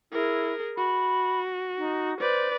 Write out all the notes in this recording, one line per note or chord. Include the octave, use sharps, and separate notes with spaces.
E4 G#4 A#4
F#4 B5
D#4
B4 C5 D5